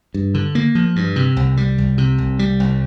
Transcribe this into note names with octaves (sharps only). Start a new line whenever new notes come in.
G2
D3
A#3
F3
G2
C3
C2
G3
C2
C3
C2
G3
C2